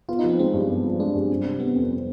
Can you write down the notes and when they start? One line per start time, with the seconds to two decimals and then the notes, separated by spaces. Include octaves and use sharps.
0.08 B3 F4
0.19 F3 D#4
0.29 C4
0.39 G#3 C4
0.53 G2
0.69 B3
0.84 F3
1.00 G#3 D4
1.15 G2
1.30 C4
1.44 C3
1.60 G3 B3
1.75 F2
1.90 C4